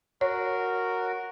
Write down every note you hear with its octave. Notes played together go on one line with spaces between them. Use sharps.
F#4 A#4 C#5